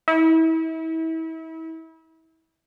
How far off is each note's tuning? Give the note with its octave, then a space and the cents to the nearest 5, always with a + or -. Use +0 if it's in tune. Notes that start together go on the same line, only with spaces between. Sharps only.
E4 -35